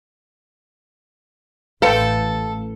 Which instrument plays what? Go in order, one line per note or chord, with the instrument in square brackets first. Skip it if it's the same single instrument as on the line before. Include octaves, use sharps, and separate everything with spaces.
[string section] A1 [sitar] A4 [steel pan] B4 C5 G5 [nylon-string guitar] F5